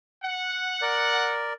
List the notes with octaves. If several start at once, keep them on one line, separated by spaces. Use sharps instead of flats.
F#5
A#4 D5